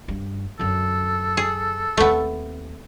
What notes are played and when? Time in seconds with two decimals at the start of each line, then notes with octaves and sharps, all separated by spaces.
0.08 G2
0.59 F#2 D3 A4
1.37 G#4
1.97 D#2 A3 B3 C4